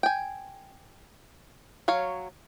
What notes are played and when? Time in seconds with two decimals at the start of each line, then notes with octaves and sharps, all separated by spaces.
0.03 G5 G#5
1.88 F#3 C#5 F5